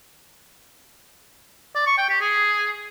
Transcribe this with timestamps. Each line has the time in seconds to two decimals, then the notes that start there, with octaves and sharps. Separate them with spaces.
1.75 D5
1.86 C#6
1.98 G5
2.09 G4
2.20 G#4